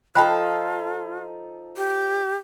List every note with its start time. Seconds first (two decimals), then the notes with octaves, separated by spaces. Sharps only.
0.15 F3 D#4 F4 A4 G5 B5 F#6
1.77 G4